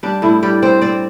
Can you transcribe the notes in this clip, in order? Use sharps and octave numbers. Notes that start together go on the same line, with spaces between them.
G3 D4
A2 E4
G3 D5
C4 C5
C4 D5